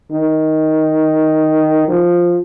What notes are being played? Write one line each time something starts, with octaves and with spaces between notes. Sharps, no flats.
D#3
F3